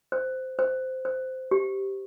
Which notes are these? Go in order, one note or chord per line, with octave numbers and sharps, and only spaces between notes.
C5
C5
C5
G4